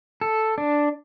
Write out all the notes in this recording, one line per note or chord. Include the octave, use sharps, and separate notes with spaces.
A4
D4